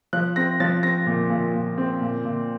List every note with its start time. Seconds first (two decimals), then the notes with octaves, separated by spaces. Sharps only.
0.13 F3 F#6
0.36 C4 A#6
0.60 F3 A6
0.83 C4 A#6
1.06 A#2
1.30 A#2
1.54 A#2
1.78 C4
2.01 A#2
2.25 A#2